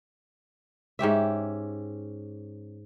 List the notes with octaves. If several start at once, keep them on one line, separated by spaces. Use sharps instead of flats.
G#2 C#4 G4 E5